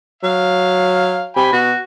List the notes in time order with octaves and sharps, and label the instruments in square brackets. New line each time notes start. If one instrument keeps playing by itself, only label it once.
[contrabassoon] F#3 [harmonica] F5
[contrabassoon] C3 [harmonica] G5 G#5 B5
[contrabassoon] B2 [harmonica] F#4